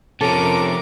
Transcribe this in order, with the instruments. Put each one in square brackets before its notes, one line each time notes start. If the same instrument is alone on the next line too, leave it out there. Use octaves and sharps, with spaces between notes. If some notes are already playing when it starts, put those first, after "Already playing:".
[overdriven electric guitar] C3 F3 [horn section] A3 C#4 [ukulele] A4 [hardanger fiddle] A#4 D6